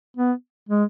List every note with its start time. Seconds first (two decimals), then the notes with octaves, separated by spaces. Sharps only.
0.17 B3
0.69 G#3